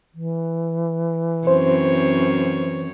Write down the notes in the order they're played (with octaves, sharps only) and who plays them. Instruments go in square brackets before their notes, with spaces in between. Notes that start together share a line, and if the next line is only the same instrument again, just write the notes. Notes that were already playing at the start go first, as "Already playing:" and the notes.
[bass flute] E3
[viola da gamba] F#2 C4 C#5 [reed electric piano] C5